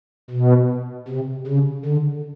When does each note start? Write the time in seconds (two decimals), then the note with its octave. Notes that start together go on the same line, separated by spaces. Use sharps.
0.30 B2
1.08 C3
1.47 C#3
1.85 D3